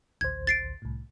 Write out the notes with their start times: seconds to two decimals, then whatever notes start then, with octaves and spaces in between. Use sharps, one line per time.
0.21 A1 D2 C5 G#6
0.47 A6 C7 D7
0.82 C2 A2